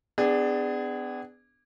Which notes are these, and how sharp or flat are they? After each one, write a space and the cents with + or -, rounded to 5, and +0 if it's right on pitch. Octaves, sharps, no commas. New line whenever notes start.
B3 +35 D4 +10 G#4 -20